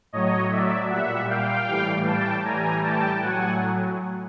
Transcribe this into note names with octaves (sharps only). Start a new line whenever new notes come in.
A2 F#3 C#5 D#5
D5 E5
A#2 G3 E5 F#5
F5 G5
A2 E3 G3
G5 A5
A2 E3 G3 G#5 A#5
G5 A5
A2 F#3 F#5 G#5